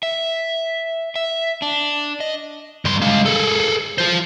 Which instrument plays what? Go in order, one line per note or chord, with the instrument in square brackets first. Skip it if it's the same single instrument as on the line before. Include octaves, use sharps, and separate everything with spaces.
[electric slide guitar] E5
E5
D4
D#5
[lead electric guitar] G2 C6
G#3 F5
G#4 A4
F4 C5